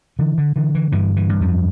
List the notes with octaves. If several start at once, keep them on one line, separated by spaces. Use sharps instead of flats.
D3 E3
D3
D3 E3
E3
G2 E3
E3
G2
F2 F3